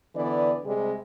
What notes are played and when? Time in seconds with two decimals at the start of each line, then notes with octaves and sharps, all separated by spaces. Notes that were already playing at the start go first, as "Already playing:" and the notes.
0.15 D3 E3 B3 B4 D5
0.64 C3 G3 G#3